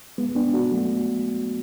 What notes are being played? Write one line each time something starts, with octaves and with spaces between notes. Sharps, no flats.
G#3 B3
B3 D4
D4 F#4
F#3 A3